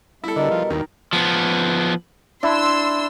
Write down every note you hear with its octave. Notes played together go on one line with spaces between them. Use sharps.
G3 E4 A4 E5
B2 D3 G3 A#4 D#5
F3
D#2 D#3
F3 B3
D4 E4 C6 E6